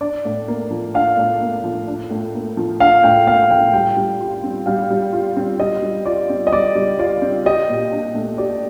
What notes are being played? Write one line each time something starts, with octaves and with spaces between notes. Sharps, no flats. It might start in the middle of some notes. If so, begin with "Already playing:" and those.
D4 D5
A2
A#3
F3
D4 F5
A2
A#3
F3
D4
A2
A#3
F3
D4 F5
A2 G5
A#3 F5
F3 G5
G3 G5
G3
F4
C4
G3 F5
G3
F4
C4
G3 D#5
G3
F4 D5
C4
D#5
G3 D5
G3
F4 D5
C4
G4 D#5
A#2
D4
A3
G4 D5